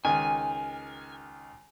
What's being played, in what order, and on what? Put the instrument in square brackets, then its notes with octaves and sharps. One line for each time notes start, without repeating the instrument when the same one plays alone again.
[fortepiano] C#2 D#3 [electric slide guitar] G#5